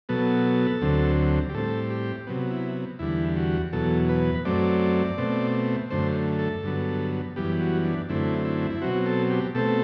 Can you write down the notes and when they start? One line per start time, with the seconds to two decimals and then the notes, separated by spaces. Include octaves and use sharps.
0.09 B2 F#3 B3 A4
0.81 D2 D3 F#3 C4
1.49 G4
1.54 A2 G3 C4 A4
1.90 G4
2.27 C3 F#3 B3
2.51 E4
2.99 E2 D3 G3 E4
3.37 F#4
3.73 E2 B2 F#3 A4
4.09 B4
4.45 F#2 F#3 A3 C4 D5
5.18 B2 A3 C4
5.90 F#2 D3 A3 C5
6.39 A4
6.63 G2 D3 F#3 B3
7.36 F#2 E3 G3 B3 G4
7.61 F#4
7.85 D4
8.09 F#2 D3 A3 C4 E4
8.45 E4
8.71 E4
8.82 B2 F#3 C4 F#4
9.06 A4
9.30 G4
9.55 B2 A3 C4 A4